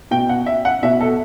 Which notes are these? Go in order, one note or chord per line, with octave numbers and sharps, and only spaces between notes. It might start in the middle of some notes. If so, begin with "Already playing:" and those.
B2 G5
F#5
E5
F#5
B2 E5
A4